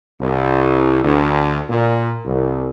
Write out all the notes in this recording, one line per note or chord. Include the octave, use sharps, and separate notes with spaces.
C2
D2
A#2
C2